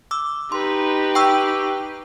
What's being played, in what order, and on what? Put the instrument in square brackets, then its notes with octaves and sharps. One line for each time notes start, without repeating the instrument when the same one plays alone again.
[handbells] D6 E6
[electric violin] D#4 B4 [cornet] G4 [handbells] C6
[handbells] G5 C#6 E6